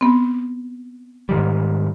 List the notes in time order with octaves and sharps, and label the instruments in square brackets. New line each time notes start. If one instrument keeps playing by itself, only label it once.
[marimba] B3 C4
[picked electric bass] G#2 D#3 G3